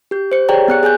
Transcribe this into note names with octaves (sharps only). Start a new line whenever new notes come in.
G4 G6
C5 C#7
G4 G#4 C#5 D5 G5 A#5
B3 F#6 C#7
G#4 G#5 F#6 G6